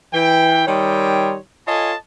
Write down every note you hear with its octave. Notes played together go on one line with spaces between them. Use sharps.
E3 G5
D#3 G3 D#4 C#5 G5 C6
F4 A4 C#5 D#5 G#5 A5